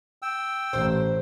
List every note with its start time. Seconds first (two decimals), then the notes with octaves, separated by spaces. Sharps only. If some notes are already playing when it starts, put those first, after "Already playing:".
0.22 G5 E6
0.73 A1 C5